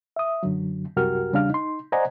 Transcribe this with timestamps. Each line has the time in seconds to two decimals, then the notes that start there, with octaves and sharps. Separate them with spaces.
0.16 E5 D#6
0.43 F#2 D3 F#3
0.96 C2 F#2 F#4 G4 A#4 F6
1.33 E2 C#3 G3 D4 F5 F6
1.50 D#4 C6
1.92 C5 D5 D#5 F#5 G#5 A#5